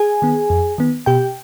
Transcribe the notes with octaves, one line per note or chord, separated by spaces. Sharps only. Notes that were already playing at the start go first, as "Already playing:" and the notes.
Already playing: G#4 G#5
D#3 B3
F2
D#3 B3
B2 G4 G5